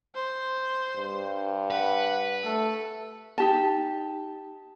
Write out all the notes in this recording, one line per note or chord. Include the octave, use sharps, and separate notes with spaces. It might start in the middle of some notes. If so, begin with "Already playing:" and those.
C5
G2
B4 F#5
A3 A4
D#4 G4 A5